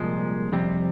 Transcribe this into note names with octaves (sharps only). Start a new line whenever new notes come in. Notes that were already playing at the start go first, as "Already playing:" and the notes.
Already playing: C2 A#2 F3 G#3
F2 C3 G3 C4